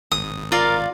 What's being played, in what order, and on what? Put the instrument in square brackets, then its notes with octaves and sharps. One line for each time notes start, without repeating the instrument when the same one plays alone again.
[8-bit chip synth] G#1 [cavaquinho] D#6
[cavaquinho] F4 D5 F5 [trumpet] A#4